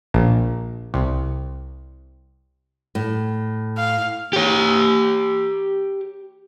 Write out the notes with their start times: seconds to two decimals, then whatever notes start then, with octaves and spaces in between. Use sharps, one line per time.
0.14 A#1
0.94 C2
2.95 A2
3.78 F5
4.33 G4 C#5